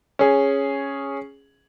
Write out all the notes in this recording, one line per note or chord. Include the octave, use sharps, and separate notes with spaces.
C#4 G#4